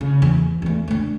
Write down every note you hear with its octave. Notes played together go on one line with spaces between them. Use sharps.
C#3
E2
E2 A3
D3 A3